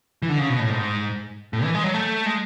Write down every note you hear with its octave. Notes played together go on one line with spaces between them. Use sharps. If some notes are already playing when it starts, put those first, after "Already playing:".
E3
D3
C#3
B2
A2
G#2
A2
E3
G#3
F#3
A3
G#3